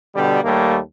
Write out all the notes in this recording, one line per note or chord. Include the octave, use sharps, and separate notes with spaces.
B2 D3 G3
D#2 G3 A3 A#3